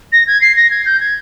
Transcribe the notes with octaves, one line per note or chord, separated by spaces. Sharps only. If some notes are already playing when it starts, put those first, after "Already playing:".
A#6
G#6
C7
A#6
G#6
G6
G#6